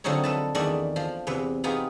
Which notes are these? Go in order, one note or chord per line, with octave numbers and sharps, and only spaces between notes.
D3 F3 F#3 C4 D#4 C#5
A4 B4 A5
E2 D#3 A3 D4 D5 B5
F3
E2 C3 B4
B3 D#4 F4 G4 G#4